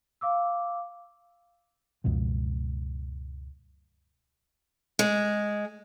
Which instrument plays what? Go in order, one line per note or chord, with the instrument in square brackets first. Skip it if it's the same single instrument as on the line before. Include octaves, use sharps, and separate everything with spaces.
[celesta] F5 D6 E6
[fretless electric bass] C#2 F#2 B2 F3
[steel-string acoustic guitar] G#3